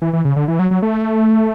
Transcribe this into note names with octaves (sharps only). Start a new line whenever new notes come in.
E3
E3
C#3
D3
E3
F#3
F#3
A3